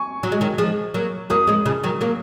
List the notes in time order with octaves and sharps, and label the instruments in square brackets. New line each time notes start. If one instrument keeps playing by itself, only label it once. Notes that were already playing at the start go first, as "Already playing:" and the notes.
Already playing: [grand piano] G#5 C#6
[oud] F#3
G#3
D#3 F#3
F3 G#3
F#3 A#3
[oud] F#3 A#3 [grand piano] D#6
[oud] F3 G#3
C#3 F3
D#3 F#3
F#3 A#3